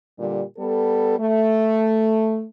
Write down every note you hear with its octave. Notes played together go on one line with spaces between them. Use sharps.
A#2 D3 G3
G3 B3 A4
A3